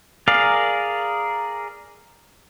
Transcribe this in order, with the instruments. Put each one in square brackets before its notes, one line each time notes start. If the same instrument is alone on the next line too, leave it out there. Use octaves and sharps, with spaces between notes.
[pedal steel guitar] G#4 A#4 D5 F5